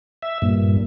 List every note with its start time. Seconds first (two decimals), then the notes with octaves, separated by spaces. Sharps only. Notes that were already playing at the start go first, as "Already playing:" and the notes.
0.22 E5
0.42 G2 A#2